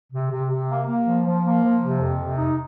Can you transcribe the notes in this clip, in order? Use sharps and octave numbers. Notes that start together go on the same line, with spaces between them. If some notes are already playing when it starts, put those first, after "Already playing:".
C3
C3
C3
A#3
A#3
F3
F3
A#3
F3
C3
F2
C3
D#4